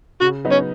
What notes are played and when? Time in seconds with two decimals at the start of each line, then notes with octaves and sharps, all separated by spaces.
0.21 C#3 F#4
0.45 F#3 B3 D#4
0.52 C#4